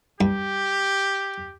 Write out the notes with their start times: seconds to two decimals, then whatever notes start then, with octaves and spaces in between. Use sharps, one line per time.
0.21 G2 G4